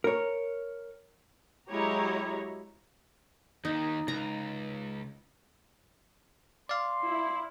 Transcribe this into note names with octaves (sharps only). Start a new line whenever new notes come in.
A#4 C#5
F#3 G#3 E4 G4 C#5 A#5
D#2 D#3 D#4
C#2 A#5
D5 F5 C6
E4